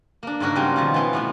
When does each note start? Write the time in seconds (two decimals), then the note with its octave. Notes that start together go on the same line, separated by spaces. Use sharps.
0.23 A#3 D4
0.40 G#2 C#3 D4 F#4 A#4
0.56 C#3 F#3 G3 C4
0.76 B2 D#3 F3
0.94 E3 B3 E4
1.13 A2 C3 B3